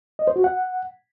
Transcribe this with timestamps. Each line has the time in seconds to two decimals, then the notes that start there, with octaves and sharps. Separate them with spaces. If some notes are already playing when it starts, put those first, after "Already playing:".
0.19 D#5
0.27 C5
0.36 F#4
0.44 F#5